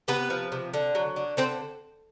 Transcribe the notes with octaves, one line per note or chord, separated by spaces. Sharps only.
C3 B3 B4
F3
C3
D3
F#3
D3
D3 C4 C5